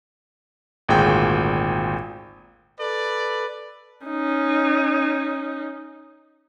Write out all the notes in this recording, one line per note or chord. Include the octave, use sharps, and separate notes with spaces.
G#1 D2 A#2 G#4 G5 G6
A4 B4 D5
C#4 D#4